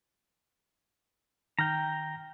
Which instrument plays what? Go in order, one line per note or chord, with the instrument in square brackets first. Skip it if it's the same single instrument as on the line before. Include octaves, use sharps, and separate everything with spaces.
[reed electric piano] D#3 F6 G6 [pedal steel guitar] G5 A#5